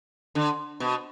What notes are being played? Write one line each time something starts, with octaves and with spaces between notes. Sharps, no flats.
D3
B2